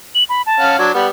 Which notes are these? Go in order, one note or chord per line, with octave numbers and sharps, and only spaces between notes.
F#7
B5
A5
C#4 F5 F#5
F#3 D4 G#6
G3 B3 F#5